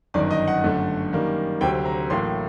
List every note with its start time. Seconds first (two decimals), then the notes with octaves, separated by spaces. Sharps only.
0.14 G1 F#2 D#3 D5
0.31 D#5
0.48 F#5
0.64 G1 F#2 D3 A3
1.12 F#2 D#3 G3 A#3
1.61 D2 C3 F#3 C4 G5
1.85 A#5
2.10 A1 A2 F#3 A#3 C6